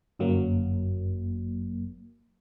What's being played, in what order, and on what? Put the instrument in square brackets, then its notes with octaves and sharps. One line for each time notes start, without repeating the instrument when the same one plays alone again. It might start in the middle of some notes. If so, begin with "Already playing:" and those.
[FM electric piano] G1 F#2 F#3 A#3